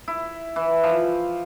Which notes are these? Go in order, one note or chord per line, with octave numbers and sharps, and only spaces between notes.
E4
E3
F3